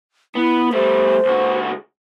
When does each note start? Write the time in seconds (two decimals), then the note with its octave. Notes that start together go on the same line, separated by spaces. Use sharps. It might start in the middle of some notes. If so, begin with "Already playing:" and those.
0.35 B3 E4
0.73 G3 A3 C5
1.25 C#2 F#4